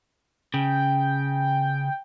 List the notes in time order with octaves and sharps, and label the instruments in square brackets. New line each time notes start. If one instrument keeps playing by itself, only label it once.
[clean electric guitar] C#3 [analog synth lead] G5